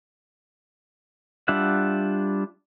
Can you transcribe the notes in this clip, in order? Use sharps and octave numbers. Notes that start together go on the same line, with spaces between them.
G3 D4 F4 E5 F#5